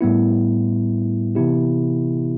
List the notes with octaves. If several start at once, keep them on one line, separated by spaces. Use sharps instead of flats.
A2 G3 B3 E4
C3 E3 B3 E4 G4